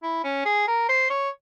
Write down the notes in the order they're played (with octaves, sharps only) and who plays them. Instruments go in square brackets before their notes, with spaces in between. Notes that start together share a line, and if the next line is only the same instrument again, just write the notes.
[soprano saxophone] E4
C#4
G#4
A#4
C5
C#5